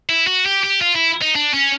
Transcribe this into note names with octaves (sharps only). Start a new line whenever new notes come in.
E4
F#4
G4
G4
F4
E4
D#4
D4
C#4